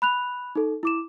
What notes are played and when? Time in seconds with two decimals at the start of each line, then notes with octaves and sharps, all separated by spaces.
0.02 B5 F#6 F7
0.55 D#4 A4
0.83 E4 D6 E7